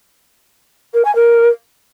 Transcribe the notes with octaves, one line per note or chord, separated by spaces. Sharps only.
A#4
G#5
A#4